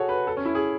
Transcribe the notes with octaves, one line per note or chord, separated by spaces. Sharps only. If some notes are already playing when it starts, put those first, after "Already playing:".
Already playing: F#4 G#4 A4 C#5
B4
A4
C#4
E4
G#4